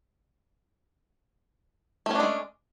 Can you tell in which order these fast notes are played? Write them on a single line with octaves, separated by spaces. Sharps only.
A3 C#4 D4 G#3